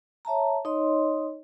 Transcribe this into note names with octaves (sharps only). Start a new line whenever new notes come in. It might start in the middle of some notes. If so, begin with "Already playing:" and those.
C#5 E5 A5 A#5
D#4 C#5 D#5 C6